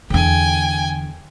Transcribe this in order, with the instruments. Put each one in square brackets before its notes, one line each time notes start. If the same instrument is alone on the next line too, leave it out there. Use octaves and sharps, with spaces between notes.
[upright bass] E2 D3 [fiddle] G5 G#5